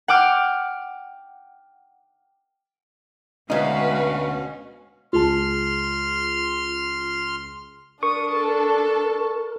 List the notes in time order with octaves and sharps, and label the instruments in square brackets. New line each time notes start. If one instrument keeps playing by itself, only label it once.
[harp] F#5 G5 D6 F6
[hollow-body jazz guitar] D2 D#4 [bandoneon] B2 C#4 [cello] G#3 B4 [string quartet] F#4 F5
[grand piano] C#2 G#4 A5 [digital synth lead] F4 [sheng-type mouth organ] C6 F6
[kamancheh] D4 [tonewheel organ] A#4 [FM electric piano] C#6 [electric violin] D#6
[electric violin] A4 A5